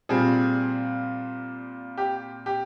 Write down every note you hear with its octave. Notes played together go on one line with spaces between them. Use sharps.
A#2 G3 C4 F4 G#4
G4
G4